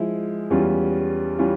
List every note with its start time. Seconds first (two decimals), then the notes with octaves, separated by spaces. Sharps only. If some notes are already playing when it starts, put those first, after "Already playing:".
Already playing: F3 G#3 E4
0.50 E2 E3 G3 C#4 F4
1.39 E3 G3 C#4 F4